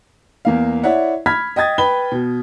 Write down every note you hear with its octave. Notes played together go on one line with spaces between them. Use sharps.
E2 A#3 F5
E4 C#5 D5 E5 F#5
B5 F6 G#6 B6
D#5 G5 D#6 G#6 A6
B4 G5 B5 G7
B2